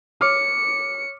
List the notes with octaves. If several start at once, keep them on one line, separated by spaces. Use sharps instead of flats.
C#5 D6 F6 C#7